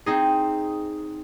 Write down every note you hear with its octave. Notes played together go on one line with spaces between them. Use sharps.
C4 D#4 G#4